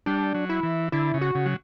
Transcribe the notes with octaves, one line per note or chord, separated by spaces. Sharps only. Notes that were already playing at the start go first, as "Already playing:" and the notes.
G3 D4
F#3
E4
E3
D3 E4
C#3
F#4
C#3
F#3